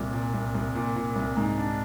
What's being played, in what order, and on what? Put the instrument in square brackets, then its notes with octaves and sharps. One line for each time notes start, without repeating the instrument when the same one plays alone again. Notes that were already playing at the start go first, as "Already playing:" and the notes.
Already playing: [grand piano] C2 A#2
A#2
C2
C2
A#2
A#2
C2
G#2
D4